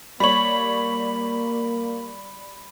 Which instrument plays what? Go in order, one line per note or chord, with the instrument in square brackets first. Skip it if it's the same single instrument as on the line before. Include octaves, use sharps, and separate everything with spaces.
[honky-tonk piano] G3 C#5 [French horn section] A#3 [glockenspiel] B5 F#7